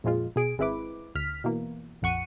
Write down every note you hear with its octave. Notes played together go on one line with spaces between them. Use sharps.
F2 A#2 F3 G#3 F4
B2 G#4 D7
G#1 G#3 C4 E4 B4 D6
D2 F6 B6
B2 E3 A#3
A#1 F2 F#5 C#6 C#7 D#7